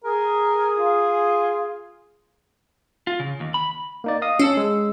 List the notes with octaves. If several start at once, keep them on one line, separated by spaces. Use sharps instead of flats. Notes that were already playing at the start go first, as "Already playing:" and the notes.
G#4 A#4
F4
F4
C#3
D#2
B5
A#3 D#4 D5
D#5 F5 D#6
C#4 A5 E6 C7
G#3 E6